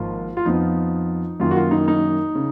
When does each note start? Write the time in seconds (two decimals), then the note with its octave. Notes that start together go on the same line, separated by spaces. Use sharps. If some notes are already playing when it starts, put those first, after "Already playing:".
Already playing: G#1 G#2 F3 A#3 F4
0.37 F4
0.45 F2 F3 B3 D#4
1.40 F#2 D#3 A#3 F4
1.51 F#4
1.56 F4
1.71 D#4
1.88 D#4
2.35 C#3